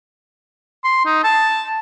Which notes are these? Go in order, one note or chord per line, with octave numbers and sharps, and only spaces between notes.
C6
D#4
A5